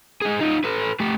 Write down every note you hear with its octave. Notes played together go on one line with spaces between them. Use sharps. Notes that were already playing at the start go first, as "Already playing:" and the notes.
D#4 G#4
D#4 F4
A4 B4
A3 G4